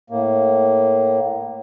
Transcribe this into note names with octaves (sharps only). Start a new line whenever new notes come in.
A2 A#3